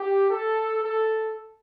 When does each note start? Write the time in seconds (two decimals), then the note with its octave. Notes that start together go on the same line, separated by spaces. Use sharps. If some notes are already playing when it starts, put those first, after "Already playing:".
Already playing: G4
0.31 A4
0.83 A4